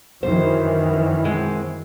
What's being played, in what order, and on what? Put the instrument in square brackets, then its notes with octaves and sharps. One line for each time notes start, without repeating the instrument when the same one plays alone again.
[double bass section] F#2 D#3 E3 [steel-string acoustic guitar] C5
[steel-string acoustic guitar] B2 G#3 C4